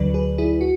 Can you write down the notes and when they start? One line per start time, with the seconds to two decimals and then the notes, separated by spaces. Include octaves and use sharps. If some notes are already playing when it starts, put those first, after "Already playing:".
Already playing: D2 D3 F#3 B4 D5
0.14 G#4 B4
0.38 E4 G#4
0.61 F#4